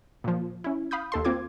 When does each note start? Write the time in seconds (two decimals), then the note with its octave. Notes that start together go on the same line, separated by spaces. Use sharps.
0.24 A#2 F3
0.64 C#4 E4
0.91 F5 B5 D#6 G6
1.12 D#2 A4 C6
1.25 A#3 C4 F4 D6 G#6